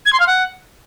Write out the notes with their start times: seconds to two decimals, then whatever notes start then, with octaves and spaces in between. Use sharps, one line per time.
0.06 G#6
0.13 C6
0.20 F5
0.27 F#5